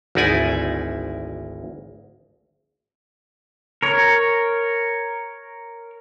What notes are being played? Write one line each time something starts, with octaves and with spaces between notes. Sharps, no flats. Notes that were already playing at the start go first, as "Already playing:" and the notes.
G#1 D2 D#4 E4 D5 G#5
A#4 C#5